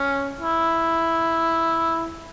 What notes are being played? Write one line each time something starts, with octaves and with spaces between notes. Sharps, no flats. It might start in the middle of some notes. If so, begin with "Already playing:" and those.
Already playing: C#4
E4